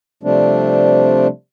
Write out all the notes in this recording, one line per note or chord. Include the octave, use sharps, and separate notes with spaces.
C3 F3 G3 A3 C4 D4